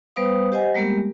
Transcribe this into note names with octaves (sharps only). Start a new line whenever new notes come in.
G3 B3 B4 C5 F5 D#6
G4 C5 D#5 F#5 G#5
G3 G#3 A#3 B3 G4 A#4